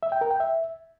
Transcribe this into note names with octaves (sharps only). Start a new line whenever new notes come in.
E5
G5
A#4
G5
E5